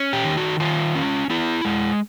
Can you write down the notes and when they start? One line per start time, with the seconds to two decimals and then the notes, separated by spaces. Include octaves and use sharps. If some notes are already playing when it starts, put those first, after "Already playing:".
Already playing: C#4
0.13 G4
0.24 D#3
0.37 F#4
0.60 D#3 F4
0.95 C#4
1.30 B3 E4
1.65 G#3